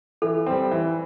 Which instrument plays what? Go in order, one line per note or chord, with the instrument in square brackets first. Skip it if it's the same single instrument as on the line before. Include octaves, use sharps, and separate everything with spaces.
[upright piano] E3 [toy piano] A4
[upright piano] G3 C4
E3